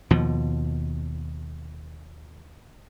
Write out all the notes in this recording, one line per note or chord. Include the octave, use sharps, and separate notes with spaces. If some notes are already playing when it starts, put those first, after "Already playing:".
D#2 B2 F3